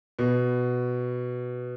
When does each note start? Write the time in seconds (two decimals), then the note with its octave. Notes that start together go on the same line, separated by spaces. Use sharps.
0.19 B2